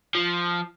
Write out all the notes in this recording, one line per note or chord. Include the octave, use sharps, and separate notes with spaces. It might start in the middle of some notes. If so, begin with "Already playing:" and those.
F3